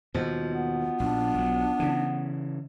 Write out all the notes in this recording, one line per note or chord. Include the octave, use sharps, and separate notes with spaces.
D#2 B2 F3 D#4 F#4
B3
A#1 D4
B1 F#3
C#3 E3